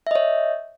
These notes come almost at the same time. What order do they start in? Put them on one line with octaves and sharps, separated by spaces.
E5 D#5 C#5